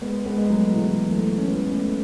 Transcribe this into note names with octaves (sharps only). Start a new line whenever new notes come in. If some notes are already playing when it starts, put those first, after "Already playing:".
G#3 B3
G#3 B3
G#3
F#3 A3
E3 G#3
F#3 A3
C#4
G#3 B3
A3 C#4